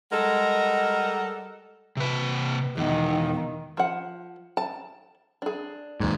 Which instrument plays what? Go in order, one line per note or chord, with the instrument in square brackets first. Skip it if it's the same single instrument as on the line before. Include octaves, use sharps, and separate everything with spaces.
[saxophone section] G3 G#3 A4 A#4 D#5 F#5
[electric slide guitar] C3 B4
[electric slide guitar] E2 B2 [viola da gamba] D#3
[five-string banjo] F3 F#5
A5
D4 G#4
[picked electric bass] D#2 G#2